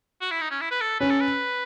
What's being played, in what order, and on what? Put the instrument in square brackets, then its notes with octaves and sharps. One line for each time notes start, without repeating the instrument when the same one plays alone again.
[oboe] F#4
E4
D#4
C#4
E4
B4
A4
[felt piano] C#4 [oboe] B4
[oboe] A4
B4